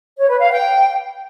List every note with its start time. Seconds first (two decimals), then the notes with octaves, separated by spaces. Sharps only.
0.19 C#5
0.30 B4
0.41 F5
0.51 G5